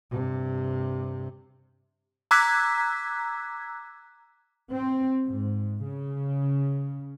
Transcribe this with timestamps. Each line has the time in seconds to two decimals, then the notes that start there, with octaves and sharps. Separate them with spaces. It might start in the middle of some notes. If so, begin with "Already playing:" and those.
0.11 G2 C3
2.31 A#5 D6 E6 F#6 G#6 B6
4.72 C4
5.26 G#2
5.83 C#3